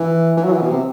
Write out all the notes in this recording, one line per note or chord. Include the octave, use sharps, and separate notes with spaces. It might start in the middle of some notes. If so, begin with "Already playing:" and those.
Already playing: E3
E3
F#3
E3
B2
C3